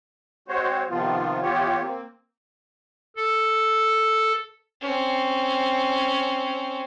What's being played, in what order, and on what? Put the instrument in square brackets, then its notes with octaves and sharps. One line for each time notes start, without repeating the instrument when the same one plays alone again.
[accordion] G#3 C4 F#4 C5 C#5
C3 D#3 F3 B3 F4
E3 B3 F4 G4 C#5
A#3 C4
[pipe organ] A4
[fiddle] C4 C#4